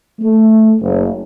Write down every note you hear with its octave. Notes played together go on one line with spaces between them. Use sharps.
A3
F#1